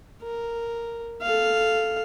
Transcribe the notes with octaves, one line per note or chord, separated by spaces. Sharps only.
A#4
A4 F5